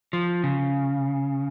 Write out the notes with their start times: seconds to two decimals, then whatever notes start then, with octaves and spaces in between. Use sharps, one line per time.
0.13 F3
0.44 C#3